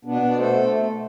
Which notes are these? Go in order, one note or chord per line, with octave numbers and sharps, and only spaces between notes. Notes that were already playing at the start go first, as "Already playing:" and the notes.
B2 B3 D4
B2
D5
A3 A4 C5
A3